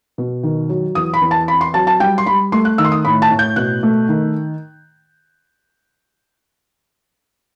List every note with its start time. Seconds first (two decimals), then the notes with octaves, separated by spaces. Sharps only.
0.18 B2
0.43 D#3
0.69 F#3
0.95 E2 D#6
1.14 B5
1.21 E2
1.31 A5
1.48 C4 B5
1.61 C6
1.74 F#3 A5
1.87 A5
2.00 G3 G5
2.18 C6
2.26 G3 B5
2.52 A3 C6
2.65 F#6
2.78 D#3 E6
2.84 C6
2.92 D#6
3.05 A2 B5
3.22 A5
3.31 A2
3.39 G6
3.56 B2 F#6
3.83 A3
4.09 D#3